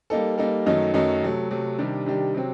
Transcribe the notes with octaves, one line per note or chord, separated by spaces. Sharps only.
G3 A#3 D#4 A4
G3 A#3 D#4 A4
F#2 D#3 F#3 A3 D#4
F#2 D#3 F#3 A3 D#4
C3 F#3 A3
C3 F#3 A3
C3 D#3 G3 D4
C3 D#3 G3 D4
C3 F#3 C4